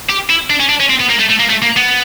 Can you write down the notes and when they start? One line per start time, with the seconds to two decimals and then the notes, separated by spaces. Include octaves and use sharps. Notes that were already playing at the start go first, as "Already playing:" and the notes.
0.10 G4
0.30 E4
0.50 D4
0.60 C#4
0.69 D4
0.80 C#4
0.89 C4
1.00 B3
1.09 A#3
1.19 A3
1.29 A3
1.39 A#3
1.50 A3
1.62 A#3
1.76 B3